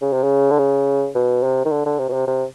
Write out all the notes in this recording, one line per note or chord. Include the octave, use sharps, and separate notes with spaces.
C#3
C3
C#3
D3
C#3
B2
C3
D#3
D3
D3
C3
B2
C3
C3